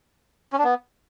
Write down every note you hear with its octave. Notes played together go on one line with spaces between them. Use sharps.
C#4
D4
B3